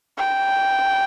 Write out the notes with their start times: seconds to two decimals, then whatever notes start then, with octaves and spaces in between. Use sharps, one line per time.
0.18 G5